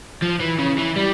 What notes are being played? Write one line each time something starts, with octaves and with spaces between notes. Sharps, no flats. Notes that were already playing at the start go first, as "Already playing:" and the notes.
F3
E3
C#3
E3
G3